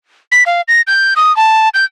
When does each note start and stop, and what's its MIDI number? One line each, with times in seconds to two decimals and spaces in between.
0.32 0.43 95
0.46 0.61 77
0.68 0.81 94
0.87 1.14 91
1.16 1.35 87
1.37 1.69 81
1.74 1.85 91